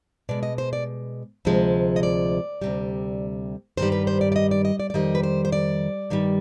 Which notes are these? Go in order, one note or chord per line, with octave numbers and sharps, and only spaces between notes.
B2 G#3 D5
D#5
C5
D5
D2 C3 F3 G#3
D#5
D5
D2 C3 G3
G2 D#3 G3 C5
B4
C5
D5
D5
D#5
D5
D#5
D5
D5
F2 D#3 G3 D#5
B4
C5
C5
D5
G2 D#3 G3